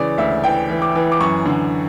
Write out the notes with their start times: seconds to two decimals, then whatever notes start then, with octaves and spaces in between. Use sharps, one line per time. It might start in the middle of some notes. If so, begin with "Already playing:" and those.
Already playing: C#3 E3 D5
0.18 D2 E5
0.44 E3 G5
0.69 E3
0.82 D6
0.95 E3
1.12 D6
1.20 F#2 C#6
1.46 D3